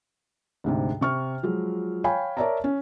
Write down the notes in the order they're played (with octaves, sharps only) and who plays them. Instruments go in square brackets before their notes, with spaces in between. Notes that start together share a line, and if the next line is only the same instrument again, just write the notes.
[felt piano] D2 G#2 C3
C3 C#6 F6
F3 F#3 G#3
C#5 F5 G5 G#5 B5
A#4 C#5 D5 E5 A5 A#5
C#4